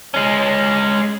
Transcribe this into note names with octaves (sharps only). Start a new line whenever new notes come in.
G#3 C#4